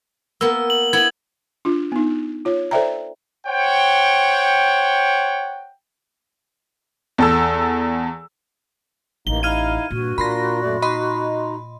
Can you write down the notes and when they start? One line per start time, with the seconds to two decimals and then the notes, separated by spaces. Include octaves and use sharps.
0.41 A#3 B3 E6
0.70 F#7
0.93 B3 E4 G#6 F#7
1.65 D4 F4
1.92 B3 D#4
2.45 F4 C#5
2.71 A4 C5 D5 E5 G5 A#5
3.47 C5 C#5 F#5 G5
7.18 E2 A4 E6
9.27 A1 A#3 D#4 G7
9.43 D#4 E4 F5 F6 G#6 D#7
9.90 G2 A#2 F#4
10.18 A#2 D4 F4 A#4 B5 C6 A#6
10.62 F#2 A3 D5
10.82 D#4 D#5 B5 C6